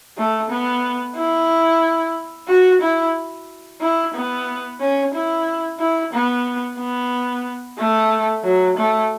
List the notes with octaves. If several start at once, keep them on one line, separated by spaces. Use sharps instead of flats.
A3
B3
E4
F#4
E4
E4
B3
C#4
E4
E4
B3
B3
A3
F#3
A3